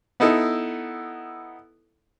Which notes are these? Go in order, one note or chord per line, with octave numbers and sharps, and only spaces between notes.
B3 D#4 E4 A4